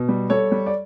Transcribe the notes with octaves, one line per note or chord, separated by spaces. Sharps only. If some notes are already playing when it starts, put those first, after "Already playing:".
Already playing: B2
G3
G3 A4 C#5
G3
D5